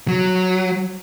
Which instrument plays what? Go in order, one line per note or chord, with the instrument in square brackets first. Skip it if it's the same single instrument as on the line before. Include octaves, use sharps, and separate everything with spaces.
[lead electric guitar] F#3